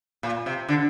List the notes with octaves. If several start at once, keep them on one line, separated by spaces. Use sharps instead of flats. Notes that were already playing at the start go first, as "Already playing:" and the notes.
A#2
C3
D3